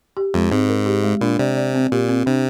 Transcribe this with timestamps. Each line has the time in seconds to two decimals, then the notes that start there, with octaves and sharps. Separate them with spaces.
0.17 G4
0.34 F2 G#3
0.52 G#2 C4
0.69 A#4
0.86 G4
1.04 G#3
1.21 A#2 D4
1.39 C3 D5
1.57 D5
1.75 C4
1.92 A#2 G4
2.09 C4
2.26 C3 D4